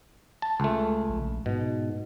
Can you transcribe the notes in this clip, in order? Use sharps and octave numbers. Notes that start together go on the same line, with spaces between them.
A5
C#2 A3
A#1
G#2 B2